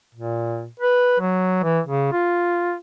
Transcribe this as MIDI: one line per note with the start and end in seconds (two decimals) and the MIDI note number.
0.15 0.67 46
0.80 1.18 71
1.20 1.60 54
1.63 1.80 52
1.87 2.12 49
2.12 2.75 65